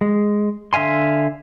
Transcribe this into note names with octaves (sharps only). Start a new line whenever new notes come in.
G#3
D3 E5 F5 G#5 C6